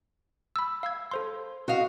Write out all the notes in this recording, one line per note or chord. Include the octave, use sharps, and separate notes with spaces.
B5 E6
F5 E6 G#6
A4 C5 C6
F#4 D#5 F5